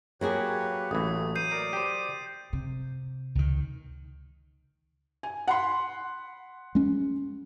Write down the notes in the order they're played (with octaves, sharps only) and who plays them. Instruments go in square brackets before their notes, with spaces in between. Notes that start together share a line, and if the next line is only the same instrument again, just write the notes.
[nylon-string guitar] F#3 A#3 G#4 [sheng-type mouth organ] G4 B4 C#5
[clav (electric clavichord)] A1 E3 [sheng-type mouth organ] A3 [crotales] D#6
[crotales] G6 C7 D#7
[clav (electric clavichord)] A#4 [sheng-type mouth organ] D5
[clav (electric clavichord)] G4 C5
[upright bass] C3
[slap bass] C#2 D#3
[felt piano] G#5
F#5 B5 C6
[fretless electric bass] G#3 C#4